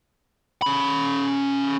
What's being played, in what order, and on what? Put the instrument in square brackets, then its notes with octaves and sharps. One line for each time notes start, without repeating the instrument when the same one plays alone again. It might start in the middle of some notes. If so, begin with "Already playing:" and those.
[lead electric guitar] C#4 B5